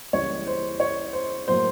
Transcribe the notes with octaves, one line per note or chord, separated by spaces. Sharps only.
C#2 C#3 E3 G3 A#3 C#5
C5
C#5
C5
A2 F#3 A#3 C5